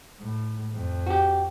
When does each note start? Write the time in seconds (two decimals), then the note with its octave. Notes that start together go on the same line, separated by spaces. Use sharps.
0.19 A2
0.72 F2
1.06 F#4 G4